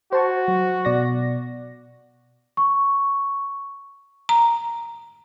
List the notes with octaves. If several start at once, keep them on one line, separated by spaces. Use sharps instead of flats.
F#4 C5 A5 C#6
F#3
B2 D5 A#6
C#6
A#5